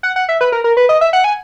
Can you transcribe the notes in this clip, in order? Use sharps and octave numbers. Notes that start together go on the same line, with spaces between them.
F#5
F#5
E5
B4
A#4
A#4
B4
D#5
E5
F#5
G#5